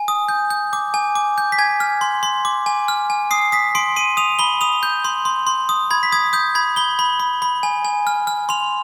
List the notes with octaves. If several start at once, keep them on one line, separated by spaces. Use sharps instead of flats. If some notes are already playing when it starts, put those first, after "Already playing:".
Already playing: G#5
D#6
G6
G6
D6
G#5
D6
G6
B6
G#5 G#6
F6
C6
C6
D6
G#5
F6
G#5
D#6 C7
D#6 B6
C6 D7
C6 D#7
D#6 F7
B5 G7
D#6 F7
G6
C6
C6
C6
D#6
B5 G#6
B6
D#6 G#6
D#6 G6
B5 G#6
B5 G7
B5
B5
B5
G#5
G#5
F6
F6
C6 F7